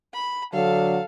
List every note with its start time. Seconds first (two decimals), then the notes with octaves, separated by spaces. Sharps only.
0.14 B5
0.53 D3 F#3 A4 F5